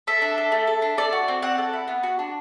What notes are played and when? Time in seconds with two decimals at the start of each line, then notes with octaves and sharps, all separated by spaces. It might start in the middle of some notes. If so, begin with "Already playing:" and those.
0.07 A4 E5
0.22 D4
0.38 A4
0.52 A3
0.67 A4
0.82 D4
0.98 A4 D5
1.13 F#4
1.28 C4
1.42 C4 F#5
1.58 A4
1.73 E4
1.88 B3
2.03 F#4
2.19 D4